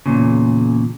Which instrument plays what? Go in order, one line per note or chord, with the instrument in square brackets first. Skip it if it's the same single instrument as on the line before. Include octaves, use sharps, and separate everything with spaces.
[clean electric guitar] E2 G2 A#2 C#3